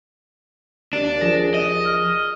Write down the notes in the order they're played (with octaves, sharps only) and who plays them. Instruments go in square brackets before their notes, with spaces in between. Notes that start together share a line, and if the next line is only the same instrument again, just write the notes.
[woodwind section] D#2 [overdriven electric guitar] D4
[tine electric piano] F3 G#4 A#6
[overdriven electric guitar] D#5
[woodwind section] F6